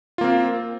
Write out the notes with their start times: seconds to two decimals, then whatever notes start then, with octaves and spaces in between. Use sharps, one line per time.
0.18 F4
0.21 A#3
0.24 C4